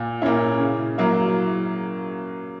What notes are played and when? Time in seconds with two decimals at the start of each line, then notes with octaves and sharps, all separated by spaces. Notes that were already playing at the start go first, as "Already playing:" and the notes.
Already playing: A#2
0.22 A#3 C#4 E4
0.60 C#3
0.98 F#3 A#3 E4